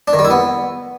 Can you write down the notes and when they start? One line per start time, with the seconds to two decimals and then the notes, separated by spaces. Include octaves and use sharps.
0.08 D4
0.13 D#3
0.19 G3
0.25 E4
0.30 B3